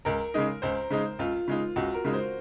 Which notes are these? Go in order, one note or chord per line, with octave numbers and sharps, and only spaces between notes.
C#2 A#4
C#3 G#3 D#4
C#2 C5
C#3 G#3 D#4
C#2 F4
C#3 G#3 D#4
C#2 F#4
A#4
C#3 G#3 D#4
C5